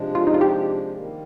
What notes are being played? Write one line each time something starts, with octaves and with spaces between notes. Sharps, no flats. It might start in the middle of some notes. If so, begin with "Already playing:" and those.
Already playing: C3 F3 G#3 D4
F4
D#4
F4
G4
D#3 G3 A#3